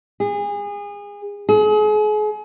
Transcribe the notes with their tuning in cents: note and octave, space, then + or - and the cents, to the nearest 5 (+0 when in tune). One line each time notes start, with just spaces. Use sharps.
G#4 -30
G#4 +35